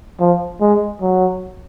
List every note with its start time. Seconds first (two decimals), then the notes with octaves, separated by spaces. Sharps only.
0.20 F3
0.61 G#3
1.01 F#3